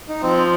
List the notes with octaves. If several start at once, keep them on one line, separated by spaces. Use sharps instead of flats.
D#4
F3 C4